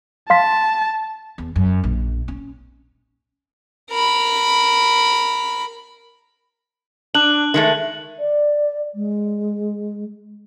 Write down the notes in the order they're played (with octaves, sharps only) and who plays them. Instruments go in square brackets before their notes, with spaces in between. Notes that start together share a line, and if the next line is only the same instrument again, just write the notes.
[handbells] F5 C6 B6 [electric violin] A5
[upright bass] E2
F#2
A#1
C#4
[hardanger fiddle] A#4 B5
[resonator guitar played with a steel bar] D4 [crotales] F#6 F#7
[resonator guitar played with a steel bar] D#3 G#3 A3
[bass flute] D5
G#3